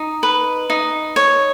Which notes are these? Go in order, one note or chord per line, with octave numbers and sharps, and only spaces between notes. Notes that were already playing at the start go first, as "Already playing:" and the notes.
Already playing: D#4
B4
D#4
C#5